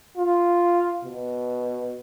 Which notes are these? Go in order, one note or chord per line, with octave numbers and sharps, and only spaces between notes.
F4
B2